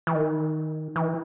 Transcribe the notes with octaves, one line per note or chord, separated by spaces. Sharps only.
E3
D#3
E3